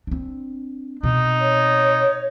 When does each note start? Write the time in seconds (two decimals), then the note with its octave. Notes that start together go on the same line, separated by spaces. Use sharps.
0.07 C4 D4
1.03 B2 C4 D#4
1.41 C#5